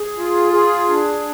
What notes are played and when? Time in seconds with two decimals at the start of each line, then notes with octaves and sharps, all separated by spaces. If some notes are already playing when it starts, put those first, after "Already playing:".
Already playing: G#4
0.18 F4
0.53 G#4
0.89 D4